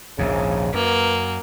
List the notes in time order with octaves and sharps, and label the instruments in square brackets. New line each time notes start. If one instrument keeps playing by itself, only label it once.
[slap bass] A#1 D#2 G#2 [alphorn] C#3
[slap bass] F#2 [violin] A#3 [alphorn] B4